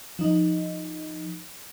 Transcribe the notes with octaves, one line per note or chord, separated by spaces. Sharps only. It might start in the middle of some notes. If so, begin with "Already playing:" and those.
F3 D#4